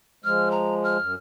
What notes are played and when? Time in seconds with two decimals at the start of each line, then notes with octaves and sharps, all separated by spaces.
0.24 F3 G#3 F6
0.51 A#5
0.84 F6
1.00 F#2